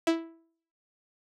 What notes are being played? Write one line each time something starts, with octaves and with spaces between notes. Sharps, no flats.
E4